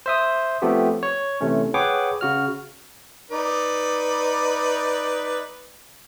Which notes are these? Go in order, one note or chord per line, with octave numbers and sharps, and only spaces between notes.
C5 E5 D#6
F3 A3 B3 C4 G4
C#5
C3 E3 A3 C#4
G#4 B4 C#5 F#5 G5 D6
C#3 F#4 F6
D#4 B4 D5